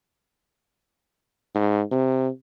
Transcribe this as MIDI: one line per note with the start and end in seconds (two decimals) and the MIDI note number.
1.55 1.82 44
1.91 2.29 48